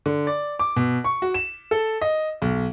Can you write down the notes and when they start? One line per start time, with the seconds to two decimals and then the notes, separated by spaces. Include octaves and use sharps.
0.06 D3
0.27 D5
0.59 D6
0.76 B2
1.04 C#6
1.22 F#4
1.34 E7
1.71 A4
2.02 D#5
2.42 B1